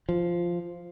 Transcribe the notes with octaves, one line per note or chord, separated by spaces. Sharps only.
F3